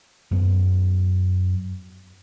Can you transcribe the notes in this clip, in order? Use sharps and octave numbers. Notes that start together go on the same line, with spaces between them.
F#2 B3